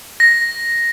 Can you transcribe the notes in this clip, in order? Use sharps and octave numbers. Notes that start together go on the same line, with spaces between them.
A#6